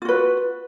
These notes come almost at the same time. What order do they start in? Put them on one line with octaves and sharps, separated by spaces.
F4 F#4 B4